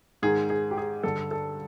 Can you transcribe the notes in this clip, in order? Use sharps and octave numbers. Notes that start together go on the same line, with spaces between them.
G#2 D#3 G#4
G#4
G4
G#4
G2 D3 A4
A4